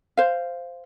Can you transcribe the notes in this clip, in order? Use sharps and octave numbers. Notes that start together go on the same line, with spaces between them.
C5 F5